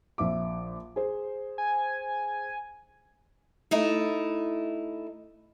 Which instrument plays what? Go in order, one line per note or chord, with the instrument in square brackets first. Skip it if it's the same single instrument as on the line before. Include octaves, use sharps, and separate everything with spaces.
[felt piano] A#1 E5 D6
G#4 C5
[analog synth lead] G#5
[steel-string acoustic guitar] A3 D#4 E4